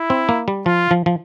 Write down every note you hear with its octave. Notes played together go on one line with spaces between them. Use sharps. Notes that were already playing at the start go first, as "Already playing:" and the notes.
Already playing: E4
C4
A#3
G3
F3 F4
F3
F3